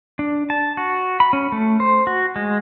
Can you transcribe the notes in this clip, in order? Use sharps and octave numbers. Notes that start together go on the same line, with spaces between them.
D4
A5
F#4
B5
C#4
A3
C5
F#4
G#3